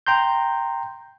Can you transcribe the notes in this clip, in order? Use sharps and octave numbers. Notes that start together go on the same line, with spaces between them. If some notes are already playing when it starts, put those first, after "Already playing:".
G5 A#5 C6 G6